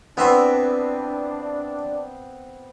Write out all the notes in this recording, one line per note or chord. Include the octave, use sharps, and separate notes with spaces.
E3 B3 C4 D4 E5 C6